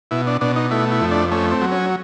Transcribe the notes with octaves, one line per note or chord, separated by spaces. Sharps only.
B2 E4
D4
B2 D4
D#4
A3 E4
E4
F2
D4
A3 C#4
C4
F#3
C#4